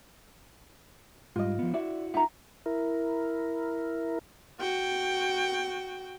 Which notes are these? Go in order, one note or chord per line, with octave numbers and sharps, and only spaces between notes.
G#2 G3 F4 D#5
F3 B3
E4 F#4 D5 E5
D#4 F4 E5 F#5 A#5
E4 A#4
F#4 G5